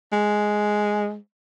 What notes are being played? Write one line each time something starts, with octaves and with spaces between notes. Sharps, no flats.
G#3